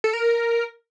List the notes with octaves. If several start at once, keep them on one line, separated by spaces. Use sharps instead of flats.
A4
A#4